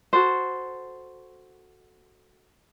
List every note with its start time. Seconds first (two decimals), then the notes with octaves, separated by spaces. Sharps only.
0.13 F#4 A4 C5